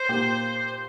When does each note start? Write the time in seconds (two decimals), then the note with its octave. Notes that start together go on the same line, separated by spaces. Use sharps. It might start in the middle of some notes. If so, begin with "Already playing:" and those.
Already playing: C5
0.09 A#2 A#3 G4